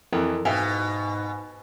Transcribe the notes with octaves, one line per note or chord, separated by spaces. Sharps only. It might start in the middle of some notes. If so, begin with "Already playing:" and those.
F2 E3 E4 A#4
G#2 B2 E5 F5 G5 G#5